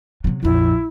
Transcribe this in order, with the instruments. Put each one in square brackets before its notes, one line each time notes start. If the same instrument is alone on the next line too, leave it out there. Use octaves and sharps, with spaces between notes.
[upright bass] C3 F#3
[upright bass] A#1 F2 [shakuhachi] E4